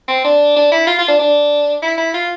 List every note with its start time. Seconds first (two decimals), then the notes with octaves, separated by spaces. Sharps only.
0.08 C4
0.24 D4
0.56 D4
0.72 E4
0.87 F4
0.99 F4
1.08 D4
1.19 D4
1.82 E4
1.98 E4
2.14 F4